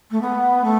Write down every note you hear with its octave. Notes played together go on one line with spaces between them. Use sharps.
A3
B3
A3